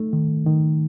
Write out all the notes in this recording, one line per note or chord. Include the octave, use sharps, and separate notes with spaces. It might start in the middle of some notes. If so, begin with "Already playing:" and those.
Already playing: A3 D#4
D#3
D#3